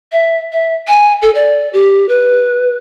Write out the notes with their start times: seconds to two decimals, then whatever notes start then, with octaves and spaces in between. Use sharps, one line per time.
0.12 E5
0.53 E5
0.88 G#5
1.22 A4
1.35 D5
1.73 G4
2.09 B4